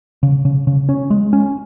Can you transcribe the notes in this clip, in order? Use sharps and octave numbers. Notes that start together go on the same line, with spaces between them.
C#3
C#3
C#3
C#4
G#3
C#4